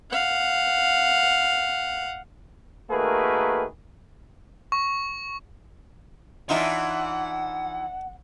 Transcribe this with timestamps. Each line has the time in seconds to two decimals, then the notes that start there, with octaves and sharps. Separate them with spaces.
0.11 F5 F#5
2.90 D#3 A3 A#3 F#4 G#4 B4
4.72 C#6
6.49 E3 D4 D#4 F4 E5 F#5 C#6